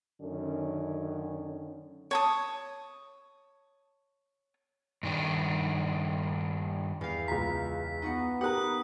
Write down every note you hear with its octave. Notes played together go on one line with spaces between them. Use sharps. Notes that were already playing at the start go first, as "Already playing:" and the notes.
F#2 D3 D#3 C#4
C#5 A5 D#6
G2 D#3 D4
E2 F5
C#2 A#5 B6
B3 D#4 F#4 C#7
G4 A#4 F#5 A#5 B5 D#6 F#6